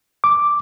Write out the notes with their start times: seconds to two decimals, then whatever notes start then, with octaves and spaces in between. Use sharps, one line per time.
0.24 D6